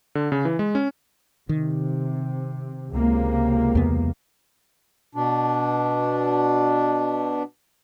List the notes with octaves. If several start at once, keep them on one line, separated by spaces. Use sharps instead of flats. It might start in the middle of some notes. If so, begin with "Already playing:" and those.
D3
C#3
E3
G#3
C#4
C3 D#3
C#2 C3 A#3
E2 B3
B2 D4